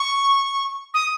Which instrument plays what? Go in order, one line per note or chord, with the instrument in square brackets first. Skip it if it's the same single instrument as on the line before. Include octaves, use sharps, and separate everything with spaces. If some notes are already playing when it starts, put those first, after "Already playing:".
Already playing: [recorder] C#6
D#6